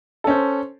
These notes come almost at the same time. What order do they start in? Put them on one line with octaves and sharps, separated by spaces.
A4 C#4 C5